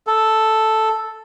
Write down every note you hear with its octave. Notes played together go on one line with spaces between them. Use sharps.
A4